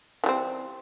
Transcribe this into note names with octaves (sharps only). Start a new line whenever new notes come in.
E3 G3 C4